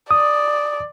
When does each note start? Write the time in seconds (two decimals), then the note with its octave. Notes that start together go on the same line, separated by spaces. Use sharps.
0.11 D5 D#6